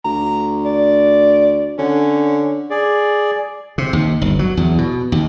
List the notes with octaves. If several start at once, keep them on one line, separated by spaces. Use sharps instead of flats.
D2 A#5
D5
D3 C#4
G#4 D5
C3
D#2
G1
F#3
E2
B2
D#2